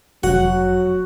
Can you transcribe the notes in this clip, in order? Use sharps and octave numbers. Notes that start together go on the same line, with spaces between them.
F1 F#3 F#4 F#5